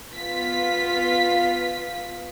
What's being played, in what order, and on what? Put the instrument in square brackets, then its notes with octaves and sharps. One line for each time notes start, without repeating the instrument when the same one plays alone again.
[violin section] B3 F4 F5 B6